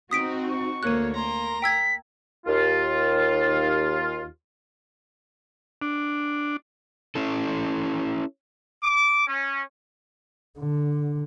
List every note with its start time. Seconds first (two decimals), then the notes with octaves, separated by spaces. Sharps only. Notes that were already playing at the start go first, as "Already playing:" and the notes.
0.11 C4 D#4 F#4 D#6 B6 D7
0.49 C#6
0.83 D2 A#3 C#5 F#6 D#7
1.15 A#3 A#5 C6
1.62 G5 E6 G#6 B6
2.46 D#2 F4
5.82 D4
7.15 C#4 E4 A4
8.83 D6
9.28 C#4
10.59 D3